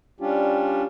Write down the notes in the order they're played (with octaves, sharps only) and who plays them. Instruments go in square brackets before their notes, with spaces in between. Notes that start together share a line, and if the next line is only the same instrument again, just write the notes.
[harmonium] G3 C#4 D4 F4 G4